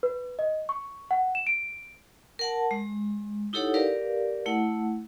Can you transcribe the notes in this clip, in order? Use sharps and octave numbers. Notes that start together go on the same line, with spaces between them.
B4
D#5
C#6
F#5
E7
D7
A#4 F#5 A5
G#3
D#4 E4 G4 A4 C#5 F#5
G4 A#4 B4 D5 F5
A3 E4 F#5